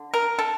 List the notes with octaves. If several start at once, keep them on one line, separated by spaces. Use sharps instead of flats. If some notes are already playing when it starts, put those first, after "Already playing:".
Already playing: D3
A#4
A4